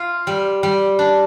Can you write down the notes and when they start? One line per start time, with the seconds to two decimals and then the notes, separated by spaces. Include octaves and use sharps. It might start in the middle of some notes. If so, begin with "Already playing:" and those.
Already playing: F4
0.27 G3
0.63 G3
0.99 D4